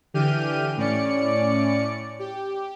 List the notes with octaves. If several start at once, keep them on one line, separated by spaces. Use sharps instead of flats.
D3 E3 G4 F6 G6 D#7
A2 C#4 D5 C#7
G4